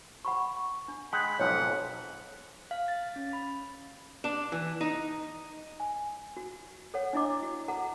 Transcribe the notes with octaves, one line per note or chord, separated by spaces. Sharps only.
F#5 B5 C#6
D4
G#3 F#5 G5 B5
B1 F2 G#2 C#5 F#5
F5
A6
C#4
B5
D4
E3
D#4
G#5
F#4
A4 C#5 F#5
D4 E4 D#5 D6
F#4
F#4 A4 F#5 A#5